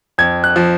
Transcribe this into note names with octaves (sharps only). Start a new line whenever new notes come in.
F2 G#6
F#6
F3